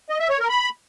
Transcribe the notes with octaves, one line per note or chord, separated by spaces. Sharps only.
D#5
E5
C#5
A#4
B5